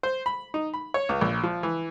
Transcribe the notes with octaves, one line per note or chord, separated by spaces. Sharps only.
C5
B5
D#4
B5
C#5
C#2
A#1
F3
E3